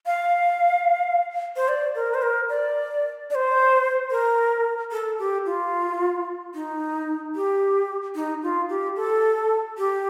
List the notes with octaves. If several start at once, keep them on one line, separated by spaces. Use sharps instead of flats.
F5
C5
D5
A#4
C5
A#4
D5
D5
C5
A#4
A4
G4
F4
D#4
G4
D#4
F4
G4
A4
G4